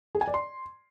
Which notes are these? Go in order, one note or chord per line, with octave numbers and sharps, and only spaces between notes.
G#4
G#5
D5
C6